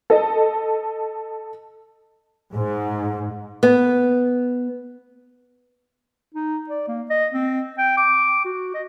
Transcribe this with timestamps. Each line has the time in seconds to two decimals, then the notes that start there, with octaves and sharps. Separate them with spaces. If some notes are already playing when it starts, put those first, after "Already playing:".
0.10 A4 D#5
2.54 G#2
3.63 B3
6.34 D#4
6.70 D5
6.88 A#3
7.10 D#5
7.33 C4
7.78 G5
7.97 D6
8.45 F#4
8.74 D#5